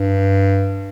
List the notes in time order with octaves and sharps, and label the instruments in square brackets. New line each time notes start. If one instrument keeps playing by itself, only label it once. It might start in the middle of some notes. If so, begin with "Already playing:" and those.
Already playing: [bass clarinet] G2